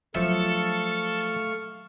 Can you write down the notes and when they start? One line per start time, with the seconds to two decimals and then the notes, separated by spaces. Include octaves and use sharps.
0.15 F3 F#3 A3 D4 A4 E5 F5 C#6